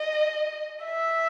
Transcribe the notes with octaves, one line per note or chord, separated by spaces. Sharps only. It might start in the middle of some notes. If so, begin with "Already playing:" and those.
Already playing: D#5
E5